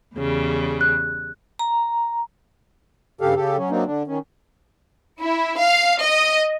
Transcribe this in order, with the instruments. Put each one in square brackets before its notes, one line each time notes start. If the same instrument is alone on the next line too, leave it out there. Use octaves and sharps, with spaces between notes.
[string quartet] E2 C#3 G3
[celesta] F#6
[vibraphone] A#5
[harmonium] G2 C#3 G4 A4 F5
C#3 G4 A4
F#3 C#4
F#3 A#3 C4 D4 D#4
D3 D4
D#3 C#4
[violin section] E4
F5
D#5